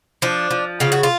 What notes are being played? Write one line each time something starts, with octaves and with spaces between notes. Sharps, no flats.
F3 D4
F3
C#3 F4
F#4
F4